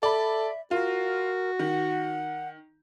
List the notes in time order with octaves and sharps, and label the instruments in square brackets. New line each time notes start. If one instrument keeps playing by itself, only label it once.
[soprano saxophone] A4 [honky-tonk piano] D5 B5 [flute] E5
[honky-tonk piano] F4 [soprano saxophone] F#4 [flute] A#4
[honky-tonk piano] D#3 [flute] F#5